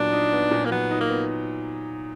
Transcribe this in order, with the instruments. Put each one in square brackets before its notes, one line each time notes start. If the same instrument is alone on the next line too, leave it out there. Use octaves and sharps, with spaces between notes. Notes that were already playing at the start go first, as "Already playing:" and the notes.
Already playing: [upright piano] A#2 F#3 B3 [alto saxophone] D4
[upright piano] D#4
B3
A#2
[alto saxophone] A#3
[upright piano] F#3 [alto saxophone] B3
[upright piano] D#4
[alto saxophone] A#3
[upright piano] B3